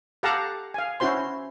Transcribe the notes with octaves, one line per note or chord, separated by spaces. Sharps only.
G4 A4 F5 F#5 A5 A#5
F5 G#5
C#4 E4 F#4 C5 C6